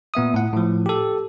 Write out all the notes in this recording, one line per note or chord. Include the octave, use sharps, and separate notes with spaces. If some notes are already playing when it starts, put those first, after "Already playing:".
A#2 B3 E5 D#6
A2 F#5
A2 F3
G4 A4